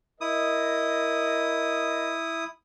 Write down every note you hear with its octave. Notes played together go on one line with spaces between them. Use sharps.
E4 A#4 D#5 D#6